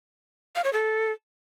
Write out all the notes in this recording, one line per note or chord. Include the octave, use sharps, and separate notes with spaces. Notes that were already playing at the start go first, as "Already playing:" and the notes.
F5
C#5
A4